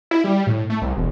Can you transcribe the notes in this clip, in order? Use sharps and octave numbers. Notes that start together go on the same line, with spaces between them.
E4
G3
A2
A3
C2
E1